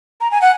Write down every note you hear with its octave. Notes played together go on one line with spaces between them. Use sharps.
A#5
G#5
F#5